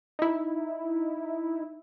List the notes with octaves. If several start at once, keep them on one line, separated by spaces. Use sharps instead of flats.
D#4 E4